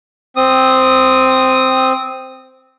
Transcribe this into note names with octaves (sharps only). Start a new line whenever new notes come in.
C4 D#6